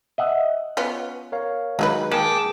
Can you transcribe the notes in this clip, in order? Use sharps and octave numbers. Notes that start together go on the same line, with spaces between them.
D#5 E5 F#5
B3 C#4 F4
A#4 C#5 F5
D#3 F#3 G#3 D#4 G#4 B4
A#3 G#4 G5 A5 D6